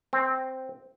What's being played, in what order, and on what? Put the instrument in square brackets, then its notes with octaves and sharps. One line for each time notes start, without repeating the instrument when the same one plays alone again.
[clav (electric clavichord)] C4